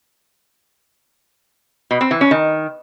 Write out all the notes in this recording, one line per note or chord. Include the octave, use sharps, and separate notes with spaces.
B2
C4
E3
C#4
D#3